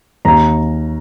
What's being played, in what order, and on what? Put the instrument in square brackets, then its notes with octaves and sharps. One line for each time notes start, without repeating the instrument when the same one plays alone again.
[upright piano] D#2 A#5